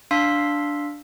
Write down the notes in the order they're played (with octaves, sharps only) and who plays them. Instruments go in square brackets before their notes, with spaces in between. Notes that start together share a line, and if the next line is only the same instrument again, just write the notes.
[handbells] D4 F5 C6 E6 B6